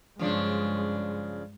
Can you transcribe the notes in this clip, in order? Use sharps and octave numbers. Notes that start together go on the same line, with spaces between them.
G2 C#3 F3 G#3 D4